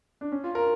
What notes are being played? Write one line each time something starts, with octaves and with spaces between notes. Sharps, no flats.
D4
C#4
F4
A#4